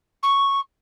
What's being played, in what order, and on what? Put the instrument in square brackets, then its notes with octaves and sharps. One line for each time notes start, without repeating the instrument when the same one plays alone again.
[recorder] C#6